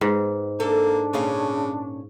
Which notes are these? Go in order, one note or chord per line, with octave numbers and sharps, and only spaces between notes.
G#2 B3
A#3 D4 A4
A#2 C#3 C#4 F5